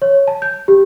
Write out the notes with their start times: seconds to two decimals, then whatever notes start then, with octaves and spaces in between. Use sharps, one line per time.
0.02 C#5
0.28 A5
0.42 G6
0.68 G4